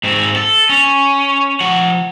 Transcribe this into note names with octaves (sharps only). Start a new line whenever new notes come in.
G#2 C4
A4
C#4
F3 F#5